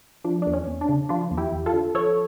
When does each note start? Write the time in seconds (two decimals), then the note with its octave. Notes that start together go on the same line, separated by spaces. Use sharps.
0.24 F3 D4
0.42 E2 D4
0.53 C#4
0.67 E2
0.81 D4
0.89 C#3
1.09 F3 D4 F4
1.31 E2
1.37 E4 G4
1.52 E2
1.66 F4 A4
1.73 D3
1.94 F3 A4 C#5